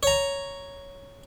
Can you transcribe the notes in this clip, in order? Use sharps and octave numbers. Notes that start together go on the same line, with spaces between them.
C#5 A#5